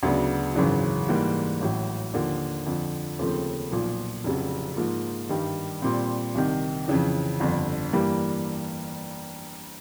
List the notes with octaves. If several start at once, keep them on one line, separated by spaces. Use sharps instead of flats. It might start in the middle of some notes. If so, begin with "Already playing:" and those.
D2 C#3 F#3 B3 D4
G#1 F#2 C#3 E3
G#2 E3 G3 A#3
A1 A2 F#3
D#2 D3 F3 A#3
F2 D3 F3
D#2 C#3 F3 A3 C4
B1 A#2 F3
F1 F2 C#3 F#3
G#2 F3 A#3
G2 D#3 G3
A#2 G3 C4
C2 C3 D#3
F2 C#3 E3
G1 F2 D3
G2 E3 G3 A#3